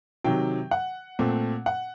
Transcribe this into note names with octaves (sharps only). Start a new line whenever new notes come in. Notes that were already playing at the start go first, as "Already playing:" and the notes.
C3 D#3 F#3 G5
F#5
A#2 A3 C4
F#5